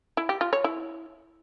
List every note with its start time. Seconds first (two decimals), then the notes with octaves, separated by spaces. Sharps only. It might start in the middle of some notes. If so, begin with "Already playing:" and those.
0.17 E4
0.29 G4
0.41 F4
0.53 C#5
0.64 E4